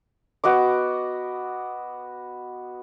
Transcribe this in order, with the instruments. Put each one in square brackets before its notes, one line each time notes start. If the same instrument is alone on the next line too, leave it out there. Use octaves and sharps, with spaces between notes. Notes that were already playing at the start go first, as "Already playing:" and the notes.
[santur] B3 F#4 D#5 D6